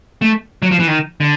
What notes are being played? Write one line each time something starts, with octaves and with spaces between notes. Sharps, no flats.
A3
F#3
F3
E3
D#3
D3